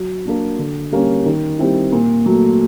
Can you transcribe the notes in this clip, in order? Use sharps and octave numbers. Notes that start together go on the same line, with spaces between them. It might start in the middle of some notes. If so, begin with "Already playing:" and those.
Already playing: F#3
A#3 D4 F#4
D3
G3 A#3 C#4
D#3
G3 C4 E4
A#2
F#3 A3